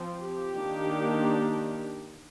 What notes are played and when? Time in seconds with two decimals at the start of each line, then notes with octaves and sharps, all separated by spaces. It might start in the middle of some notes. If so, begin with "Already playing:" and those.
Already playing: F3 C4
0.22 G4
0.58 D#3 A#3 D4